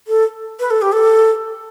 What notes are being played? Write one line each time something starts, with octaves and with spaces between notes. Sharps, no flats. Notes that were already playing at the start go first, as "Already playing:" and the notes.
A4
B4
A4
G4
A4